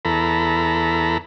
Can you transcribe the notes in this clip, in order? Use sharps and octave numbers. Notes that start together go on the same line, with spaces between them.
E2 A4 A#5 B5